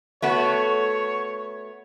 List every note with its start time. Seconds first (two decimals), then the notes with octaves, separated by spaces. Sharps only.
0.22 A3 B3 F#4 C#5